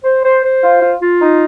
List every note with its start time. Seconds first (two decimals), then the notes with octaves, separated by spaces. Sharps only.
0.05 C5
0.25 C5
0.44 C5
0.63 F4
0.82 F4
1.02 F4
1.22 D#4